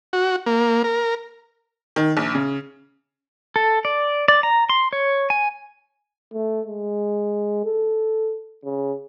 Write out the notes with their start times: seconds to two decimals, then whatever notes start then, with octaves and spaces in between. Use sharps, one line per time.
0.13 F#4
0.46 A#3
0.84 A#4
1.96 D#3
2.17 A#1
2.35 C#3
3.56 A4
3.85 D5
4.28 D5
4.43 A#5
4.70 C6
4.93 C#5
5.30 G#5
6.34 A3
6.67 G#3
7.65 A4
8.64 C#3